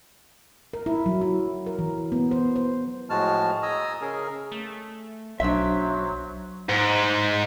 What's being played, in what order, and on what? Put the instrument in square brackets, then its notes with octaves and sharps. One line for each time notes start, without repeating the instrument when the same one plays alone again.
[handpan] A#4
E4
F#3
E4
A#4
E3
B3
C5
C5
[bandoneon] A2 F3 G#3 F#4 A5 F6
D#5 G#5 A#5 D#6 E6
C#3 C#4 G#4 A#4
[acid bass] A3
[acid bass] B1 [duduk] F#3 [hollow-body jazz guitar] D4 E5 [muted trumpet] C5
[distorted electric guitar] G#2